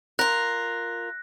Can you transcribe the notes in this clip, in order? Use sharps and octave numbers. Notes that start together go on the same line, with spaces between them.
F4 A#4 F#6 A#6